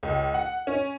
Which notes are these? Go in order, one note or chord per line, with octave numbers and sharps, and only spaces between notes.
C#2
F#5
C#4